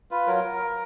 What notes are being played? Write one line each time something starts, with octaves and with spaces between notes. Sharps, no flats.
F4 B4
F#3 A#4